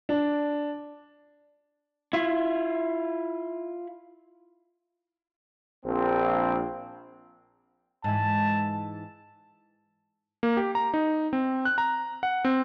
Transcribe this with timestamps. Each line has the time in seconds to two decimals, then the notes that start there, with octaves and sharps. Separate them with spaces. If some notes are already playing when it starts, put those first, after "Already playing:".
0.09 D4
2.13 E4 F4
5.86 A#1 C4
8.04 G#2 E3 A5
10.43 A#3
10.57 G4
10.75 A#5
10.94 D#4
11.33 C4
11.65 F#6
11.78 A#5
12.23 F#5
12.45 C4